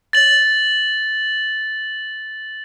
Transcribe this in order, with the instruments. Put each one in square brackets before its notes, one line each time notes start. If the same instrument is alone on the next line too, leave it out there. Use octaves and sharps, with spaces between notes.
[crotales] A6 F#7